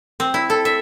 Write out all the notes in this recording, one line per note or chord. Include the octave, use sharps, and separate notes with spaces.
C4
E4
A4
E5